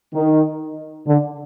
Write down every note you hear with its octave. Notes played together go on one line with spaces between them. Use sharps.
D#3
D3